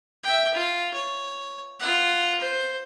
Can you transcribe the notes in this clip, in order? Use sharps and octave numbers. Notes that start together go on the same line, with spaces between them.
E5 G5
F4
C#5
F4 F#5
C5